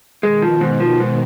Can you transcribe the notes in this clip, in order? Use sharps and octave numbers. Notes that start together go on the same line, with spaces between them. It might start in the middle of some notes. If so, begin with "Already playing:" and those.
B2 D#3 G#3
F3
G#2
F3
G#2